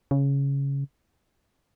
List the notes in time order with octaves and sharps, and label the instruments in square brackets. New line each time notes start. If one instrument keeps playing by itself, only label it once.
[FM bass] C#3